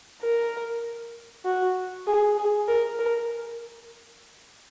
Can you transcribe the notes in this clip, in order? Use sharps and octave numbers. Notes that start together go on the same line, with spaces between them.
A#4
F#4
G#4
G#4
A#4
A#4